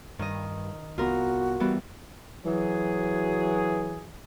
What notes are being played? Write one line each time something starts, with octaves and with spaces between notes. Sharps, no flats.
G2 D#3 D#5
C2 B3 F4 F#4 A#4
E3 G3 B3
E3 F#3 G#4